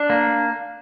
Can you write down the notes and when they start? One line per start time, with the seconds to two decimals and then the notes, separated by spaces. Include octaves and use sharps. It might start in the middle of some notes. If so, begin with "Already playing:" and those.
Already playing: D4
0.10 A#3